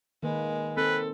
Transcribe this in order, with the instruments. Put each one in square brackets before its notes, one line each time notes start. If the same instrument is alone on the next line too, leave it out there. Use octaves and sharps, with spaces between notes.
[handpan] D#3 A#3 B4 [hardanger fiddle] G#3
[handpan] C4 [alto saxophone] A4 [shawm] B4